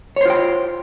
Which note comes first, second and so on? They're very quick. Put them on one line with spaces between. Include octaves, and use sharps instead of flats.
C#5 C5 F4 G5